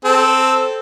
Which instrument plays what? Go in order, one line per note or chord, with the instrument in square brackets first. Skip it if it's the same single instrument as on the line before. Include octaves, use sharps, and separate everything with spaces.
[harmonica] C4 A4